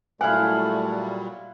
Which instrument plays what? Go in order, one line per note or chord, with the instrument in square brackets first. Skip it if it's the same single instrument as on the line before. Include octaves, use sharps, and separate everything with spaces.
[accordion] A#2 F#3 G3 [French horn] A3 [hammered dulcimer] E4 F5 F#5 [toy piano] G#5